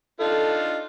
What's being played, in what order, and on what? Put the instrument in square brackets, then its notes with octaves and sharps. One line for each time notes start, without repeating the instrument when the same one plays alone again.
[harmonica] D4 D#4 F4 [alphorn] A4